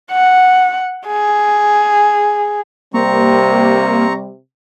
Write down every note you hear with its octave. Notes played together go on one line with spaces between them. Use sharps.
F#5
G#4
C3 G3 A#3 C4 A#5 C#6